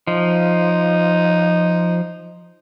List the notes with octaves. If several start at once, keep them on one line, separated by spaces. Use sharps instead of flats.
F3 D#4